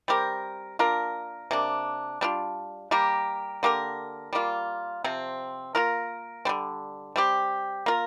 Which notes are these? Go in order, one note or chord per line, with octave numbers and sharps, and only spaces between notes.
G3 C4 G4 A#4
A#3 D4 F4 A#4
C3 A#3 D4
G3 D4 F4
G3 A#3 G4 A#4
D3 A#3 G4 A#4
G3 A#3 F4
C3 F3 C4
A#3 F4 A#4
D3 G3 C4
G3 C4 G4
A#3 F4 A#4